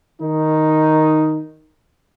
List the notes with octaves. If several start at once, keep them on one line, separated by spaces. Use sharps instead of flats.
D#3 D#4